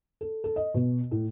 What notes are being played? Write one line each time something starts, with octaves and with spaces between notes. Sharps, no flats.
A4
A4
D#5
B2
A2